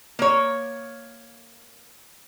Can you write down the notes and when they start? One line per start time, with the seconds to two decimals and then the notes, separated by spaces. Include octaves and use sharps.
0.19 A#3 C#5